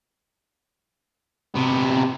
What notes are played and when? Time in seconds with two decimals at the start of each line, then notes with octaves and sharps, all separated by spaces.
1.55 C3 B3